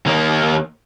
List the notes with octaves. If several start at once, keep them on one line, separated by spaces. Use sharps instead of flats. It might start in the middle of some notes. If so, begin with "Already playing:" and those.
D#2 A#3